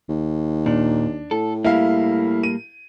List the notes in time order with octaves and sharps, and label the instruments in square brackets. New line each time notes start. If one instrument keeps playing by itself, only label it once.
[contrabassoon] D#2
[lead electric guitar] A#2 [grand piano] D4
[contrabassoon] A2 [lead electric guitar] A4
[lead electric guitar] G3 A#3 [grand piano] E4 F5
[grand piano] D#7